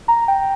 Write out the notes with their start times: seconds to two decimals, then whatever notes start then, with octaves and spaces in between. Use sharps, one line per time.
0.08 A#5
0.28 G5